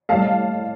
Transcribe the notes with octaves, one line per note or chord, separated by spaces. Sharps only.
A2 G3 F5 A5